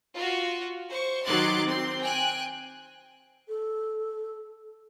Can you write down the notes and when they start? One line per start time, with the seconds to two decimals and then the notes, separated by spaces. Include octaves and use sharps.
0.15 F4 F#4
0.89 C5 C#6
1.24 D#3 F#3 C6 D6 F#6 A6
1.66 C4 C6
2.02 G5 G#5 F#6
3.48 A4